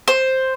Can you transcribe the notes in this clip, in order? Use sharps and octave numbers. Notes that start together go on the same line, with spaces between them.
C5